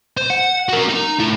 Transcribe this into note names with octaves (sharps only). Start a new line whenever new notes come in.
C5
F#5
F#4 A#4
D#4
A2 E4